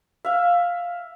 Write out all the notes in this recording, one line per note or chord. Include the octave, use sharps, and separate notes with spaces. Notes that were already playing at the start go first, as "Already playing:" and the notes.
E5 F5